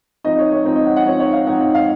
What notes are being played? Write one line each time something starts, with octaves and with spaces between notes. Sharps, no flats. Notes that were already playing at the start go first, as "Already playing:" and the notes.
F3 C4 D#4 D#5
C#5
C#5
F3 C4 D#4
D#5
F#5
F#5
F3 C4 D#4 C#5
C#5
F5
F3 C4 D#4 F#5
F#5
F5